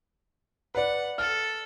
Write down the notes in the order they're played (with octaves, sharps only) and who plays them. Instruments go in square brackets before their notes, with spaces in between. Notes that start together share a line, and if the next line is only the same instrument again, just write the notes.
[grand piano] B4 D5 [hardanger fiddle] F#5
[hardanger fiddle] A4 [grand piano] F6